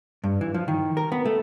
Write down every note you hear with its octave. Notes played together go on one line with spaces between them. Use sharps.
G2
E3
F3
D#3
A#4
B3
A3